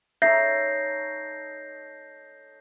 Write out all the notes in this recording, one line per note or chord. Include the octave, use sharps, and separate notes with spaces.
D#4 A4 C#5 E5 G6 A#6 C7